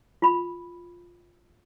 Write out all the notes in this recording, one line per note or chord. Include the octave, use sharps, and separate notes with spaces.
F4 B5